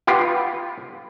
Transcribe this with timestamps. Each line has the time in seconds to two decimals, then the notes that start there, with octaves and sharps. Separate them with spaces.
0.07 F4 G4 B4 F5 F#5